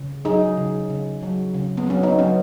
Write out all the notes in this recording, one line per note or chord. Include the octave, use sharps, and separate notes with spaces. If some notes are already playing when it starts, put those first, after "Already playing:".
Already playing: C#3
F#3 D#4 G#4
C#3
C#3
F#3
C#3
B3
F#3 C#4
B3 D#4
F#3 C#4